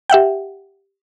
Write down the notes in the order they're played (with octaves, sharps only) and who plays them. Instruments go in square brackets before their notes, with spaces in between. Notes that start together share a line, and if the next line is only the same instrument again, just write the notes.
[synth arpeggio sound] G4 E5 F#5 G5